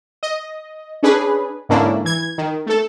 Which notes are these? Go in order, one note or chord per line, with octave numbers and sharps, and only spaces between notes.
D#5
C#4 D4 G#4 B4
G#2 D3 A#3 C#4 D4 E4
E3 G#6
D#3
A3 A4